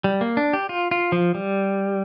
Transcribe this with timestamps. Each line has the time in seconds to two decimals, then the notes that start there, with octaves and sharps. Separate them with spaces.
0.04 G3
0.21 A#3
0.37 D4
0.53 G4
0.69 F4
0.91 F4
1.12 F3
1.35 G3